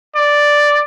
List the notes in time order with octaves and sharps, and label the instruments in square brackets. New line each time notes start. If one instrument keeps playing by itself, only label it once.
[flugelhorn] D5